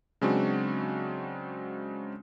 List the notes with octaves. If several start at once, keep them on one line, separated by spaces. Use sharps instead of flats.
C#3 F#3 G#3 C4 D4 F#4